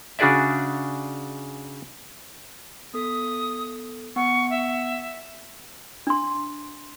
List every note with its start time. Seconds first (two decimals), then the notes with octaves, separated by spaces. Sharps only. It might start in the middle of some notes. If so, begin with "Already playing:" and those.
0.19 C#3 D4 F#4 G#4 D5 E5
2.94 B3 A4 D#6 B6
4.16 B3 F#5 C#6
4.50 E5
6.07 D4 C6